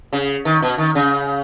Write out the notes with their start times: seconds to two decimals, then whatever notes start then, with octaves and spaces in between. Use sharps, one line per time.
0.13 C#3
0.45 D#3
0.62 B2
0.78 D#3
0.95 C#3